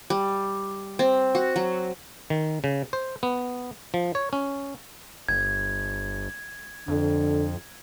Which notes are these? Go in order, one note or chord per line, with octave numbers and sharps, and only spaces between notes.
G3
C4
F#4
F#3
D#3
C#3
C5
B3
F3
C#5
C#4
G1 G#6
F2 D3